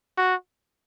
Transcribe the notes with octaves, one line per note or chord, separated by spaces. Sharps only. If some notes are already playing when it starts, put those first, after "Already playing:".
F#4